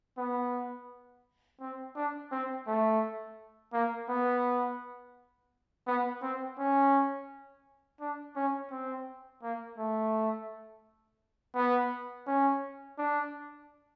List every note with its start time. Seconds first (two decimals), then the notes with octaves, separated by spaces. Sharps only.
0.18 B3
1.60 C4
1.96 D4
2.31 C4
2.67 A3
3.73 A#3
4.09 B3
5.87 B3
6.22 C4
6.58 C#4
8.00 D4
8.36 C#4
8.71 C4
9.43 A#3
9.78 A3
11.55 B3
12.27 C#4
12.98 D4